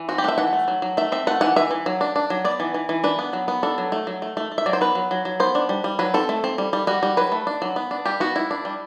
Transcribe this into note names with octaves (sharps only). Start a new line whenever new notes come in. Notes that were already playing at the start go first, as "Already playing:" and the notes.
Already playing: E3
C4 F#4
G4
A3 E5 F#5
E3 F#5
A3
F#3
F#3
A3 E5
C4 E5
A3 F#5
E3 F#5
E3 E5
E3
F#3
D4
D4
F#3
B3 D5
E3
E3
E3
D4 B4
B3
F#3
B3
D4 A4
F#3
A3
F#3
A3
A3
A3
E5
F#3 D5
C5
B3 B4
F#3
F#3
F#3
B3 C5
D4
G3
G3
F#3 B4
C4 A4
A3
C4
G3
G3
G3 F#4
G3
F#3 B4
A3
D4
F#3
B3
D4
G3 G4
B3 F#4
G3 E4
D4
G3